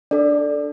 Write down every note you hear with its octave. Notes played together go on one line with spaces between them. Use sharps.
D4 A4 D5